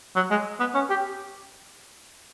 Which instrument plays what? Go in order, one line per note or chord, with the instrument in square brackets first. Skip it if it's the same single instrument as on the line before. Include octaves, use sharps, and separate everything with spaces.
[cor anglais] F#3
G#3
B3
C#4
G4